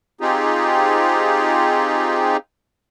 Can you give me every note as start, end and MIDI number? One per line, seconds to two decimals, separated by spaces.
0.21 2.37 60
0.21 2.37 63
0.21 2.37 65
0.21 2.37 67
0.21 2.37 68